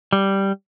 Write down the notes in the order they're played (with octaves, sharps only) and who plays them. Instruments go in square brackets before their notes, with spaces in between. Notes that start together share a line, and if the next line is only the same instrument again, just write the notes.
[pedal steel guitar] G3